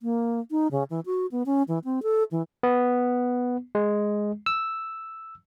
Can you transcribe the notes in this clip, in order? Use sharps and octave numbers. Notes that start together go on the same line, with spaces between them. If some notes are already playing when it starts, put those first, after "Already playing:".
A#3
D#4
C#3
E3
F#4
B3
C#4
E3
C4
A4
E3
B3
G#3
E6